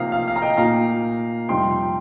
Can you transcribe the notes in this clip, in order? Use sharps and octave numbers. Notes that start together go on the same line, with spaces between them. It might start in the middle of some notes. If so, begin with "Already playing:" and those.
Already playing: C3 F3 A#3 D#4 F5 A#5 D#6
F5
F5
A#5
D#5 G5
A#2 A#3 D#4 F5 A#5
F2 C3 G3 D#4 G5 C6